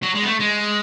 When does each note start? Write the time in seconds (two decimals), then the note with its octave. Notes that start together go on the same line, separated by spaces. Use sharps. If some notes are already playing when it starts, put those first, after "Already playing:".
0.03 F#3
0.15 G#3
0.23 B3
0.27 A3
0.40 G#3